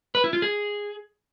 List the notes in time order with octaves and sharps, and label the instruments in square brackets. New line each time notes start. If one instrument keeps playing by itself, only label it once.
[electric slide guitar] B4
E4
F4
G#4